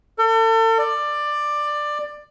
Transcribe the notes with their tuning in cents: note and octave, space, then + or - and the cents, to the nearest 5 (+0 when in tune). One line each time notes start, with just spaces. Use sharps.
A4 +40
D5 +15